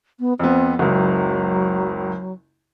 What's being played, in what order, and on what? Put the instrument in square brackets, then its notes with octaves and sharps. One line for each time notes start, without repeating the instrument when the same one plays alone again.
[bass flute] B3
[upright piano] F2 B3 [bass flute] C4
[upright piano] F#1 C#2 [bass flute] F#3